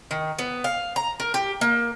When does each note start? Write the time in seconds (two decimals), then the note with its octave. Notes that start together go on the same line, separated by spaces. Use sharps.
0.11 D#3
0.39 B3
0.64 F5
0.96 A#5
1.20 A#4
1.34 G4
1.61 A#3